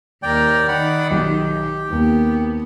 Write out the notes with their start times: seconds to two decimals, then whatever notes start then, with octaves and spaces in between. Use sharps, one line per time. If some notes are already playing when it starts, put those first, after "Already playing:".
0.23 D#2 A#4 D5 G5
0.68 D#3 D5 F#5 B5
1.11 B1 G4
1.90 D#2 A#3 B3